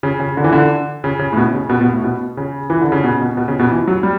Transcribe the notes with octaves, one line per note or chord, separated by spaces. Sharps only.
C#3
C#3
D3
E3
D3
C#3
C#3
A2
B2
C#3
B2
B2
A2
B2
C#3
E3
D3
C#3
B2
B2
B2
C#3
B2
E3
F#3
G3